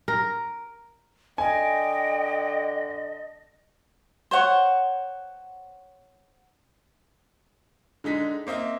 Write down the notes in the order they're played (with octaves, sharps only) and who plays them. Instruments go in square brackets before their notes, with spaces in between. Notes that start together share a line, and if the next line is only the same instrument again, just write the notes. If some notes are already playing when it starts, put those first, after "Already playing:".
[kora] A#4
[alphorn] D3 [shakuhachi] D#5 [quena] G5 [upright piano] G#5
[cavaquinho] C5 C#5 F#5
[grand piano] D3 G#3 D#4 B6
A#3 C4 D#5 E5